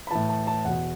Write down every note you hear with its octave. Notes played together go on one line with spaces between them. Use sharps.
B5
A2 E3 A5
A5
A5
E2 B2 F#5